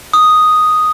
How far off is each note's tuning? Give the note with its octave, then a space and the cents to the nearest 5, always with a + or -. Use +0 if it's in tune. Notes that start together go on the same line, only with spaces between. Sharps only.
D#6 +0